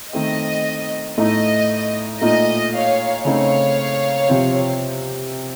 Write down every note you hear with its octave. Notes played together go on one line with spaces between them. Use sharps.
D#3 A3 C4 D#5
A2 A3 D#4 D#5
A#2 A3 D#4 D#5
C#5 F5
C#3 A3 C4 D#4 C#5 F5
C3 F3 C4